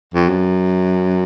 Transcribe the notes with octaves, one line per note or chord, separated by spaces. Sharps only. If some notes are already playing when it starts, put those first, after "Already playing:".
F2
F#2